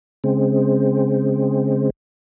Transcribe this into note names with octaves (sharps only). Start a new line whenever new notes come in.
C#3 G#3 C4